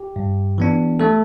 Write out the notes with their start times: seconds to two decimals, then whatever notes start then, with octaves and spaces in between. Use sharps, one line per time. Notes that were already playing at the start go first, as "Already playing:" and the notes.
Already playing: G4
0.16 G2
0.58 E3 B3 D4
1.00 A3 A4